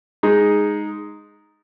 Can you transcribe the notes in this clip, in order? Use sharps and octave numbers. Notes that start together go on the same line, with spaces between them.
G#3 D#4 G#4